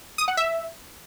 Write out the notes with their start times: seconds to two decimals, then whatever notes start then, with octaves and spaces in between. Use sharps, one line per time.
0.18 D#6
0.28 F#5
0.37 E5